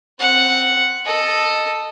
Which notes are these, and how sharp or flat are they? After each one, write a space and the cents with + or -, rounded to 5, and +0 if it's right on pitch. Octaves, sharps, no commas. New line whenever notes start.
C4 +5 F#5 +0
A4 +0 D#5 -10